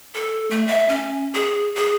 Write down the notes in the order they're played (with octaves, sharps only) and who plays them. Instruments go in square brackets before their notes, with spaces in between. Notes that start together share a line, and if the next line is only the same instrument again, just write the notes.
[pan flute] A4
A3
E5
C#4
G#4
G#4